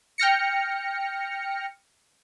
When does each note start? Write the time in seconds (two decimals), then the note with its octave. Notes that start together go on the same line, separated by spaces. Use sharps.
0.18 G5 F6 A#6 C#7